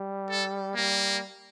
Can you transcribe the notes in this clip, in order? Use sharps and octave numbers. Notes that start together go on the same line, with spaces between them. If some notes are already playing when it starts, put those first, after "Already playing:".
Already playing: G3
A4
G3 A#3